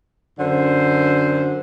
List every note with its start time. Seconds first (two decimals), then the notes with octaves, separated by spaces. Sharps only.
0.40 F#2 D3 C5